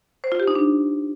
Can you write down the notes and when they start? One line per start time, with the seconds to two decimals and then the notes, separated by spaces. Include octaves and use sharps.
0.24 C5
0.32 F4
0.40 G4
0.48 D#4
0.55 D4